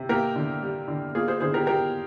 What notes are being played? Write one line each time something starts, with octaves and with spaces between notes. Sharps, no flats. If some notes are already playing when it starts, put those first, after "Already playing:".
Already playing: C3
A#3 G4 A#4
D3
G3
D3
A#3 F4 G#4
G#4 C5
D3 G#4 C5
G4 A#4
G3 G4 A#4